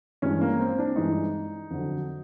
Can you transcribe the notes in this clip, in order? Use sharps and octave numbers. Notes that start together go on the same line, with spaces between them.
G2 E3 G#3 C#4
A#3
C4
D4
G2 E3 G#3 D#4
F2 D3 F#3